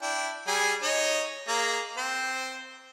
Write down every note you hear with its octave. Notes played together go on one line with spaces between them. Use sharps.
D4 E4 G5
G3 G#4 G#5
D#4 C#5 D#5
A#3 G#4 A#5
C4 C5